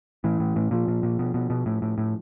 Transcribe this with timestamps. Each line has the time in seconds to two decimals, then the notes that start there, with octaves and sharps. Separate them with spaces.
0.24 A2 E3
0.40 A2
0.56 A2
0.71 A#2 F3
0.88 A#2
1.03 A#2
1.19 B2
1.34 B2
1.50 B2
1.66 A2
1.82 A2
1.98 A2